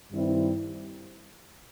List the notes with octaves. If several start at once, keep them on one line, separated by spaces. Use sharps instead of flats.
G2 D#3 G3 C4 E4